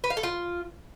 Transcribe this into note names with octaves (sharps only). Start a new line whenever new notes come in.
B4
F5
A4
F4